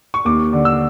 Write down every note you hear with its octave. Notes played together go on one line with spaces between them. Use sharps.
C#6
D#2 D6
D3
E6